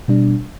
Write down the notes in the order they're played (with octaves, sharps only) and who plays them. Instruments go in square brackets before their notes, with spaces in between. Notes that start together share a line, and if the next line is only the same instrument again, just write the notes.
[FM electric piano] B2 G3 D4